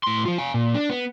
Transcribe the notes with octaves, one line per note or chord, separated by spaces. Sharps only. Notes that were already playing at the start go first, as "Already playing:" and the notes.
A2 C6
F3 F4
F5 G#5
A#2
D4
B3